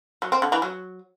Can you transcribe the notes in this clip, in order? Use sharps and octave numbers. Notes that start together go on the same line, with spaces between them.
F#3
C4
D3
E3
F#3